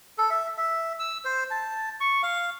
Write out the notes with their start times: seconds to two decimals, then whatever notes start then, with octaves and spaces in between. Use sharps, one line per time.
0.18 A4
0.30 E5
0.57 E5
0.99 E6
1.25 C5
1.51 A5
2.00 C#6
2.23 F5